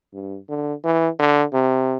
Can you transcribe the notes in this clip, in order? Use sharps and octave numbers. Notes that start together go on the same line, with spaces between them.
G2
D3
E3
D3
C3